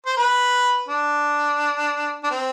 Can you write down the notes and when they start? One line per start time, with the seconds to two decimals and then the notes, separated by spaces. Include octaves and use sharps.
0.06 C5
0.18 B4
0.88 D4
2.24 D4
2.31 C4